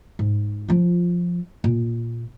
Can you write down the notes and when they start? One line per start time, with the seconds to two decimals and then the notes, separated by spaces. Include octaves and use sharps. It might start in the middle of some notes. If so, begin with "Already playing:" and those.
0.19 G#2
0.68 F3 F4
1.64 A#2